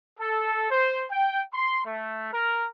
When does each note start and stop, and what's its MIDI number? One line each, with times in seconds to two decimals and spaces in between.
0.20 0.69 69
0.70 1.04 72
1.11 1.42 79
1.54 1.83 84
1.84 2.29 57
2.33 2.66 70